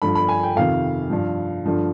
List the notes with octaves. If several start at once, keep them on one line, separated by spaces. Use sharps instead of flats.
G2 D3 F3 B5
B5
G#5
G5
F2 C3 D#3 F5
G2 F3
G2 D3 F3